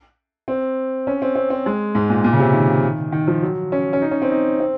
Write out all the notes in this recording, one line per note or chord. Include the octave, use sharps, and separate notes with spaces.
C4
C#4
C4
C4
C4
G#3
G#2
A#2
A#2
C#3
C3
D#3
D#3
F3
F#3
C#4
C#4
D#4
C#4
C4
D#4
C4